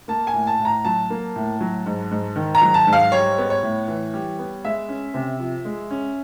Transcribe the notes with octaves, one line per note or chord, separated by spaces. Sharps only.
A#3 A5
G#5
A2
A5
A2
A#5
F#3 A5
A#3
A2
F#3
G#2
G#2
D#3
A#5
F#3
A5
G#2
F5
G3 C#5
B3
C#5
A2
E3
G3
B3
G#3 E5
C#4
C3
F3
G#3
C#4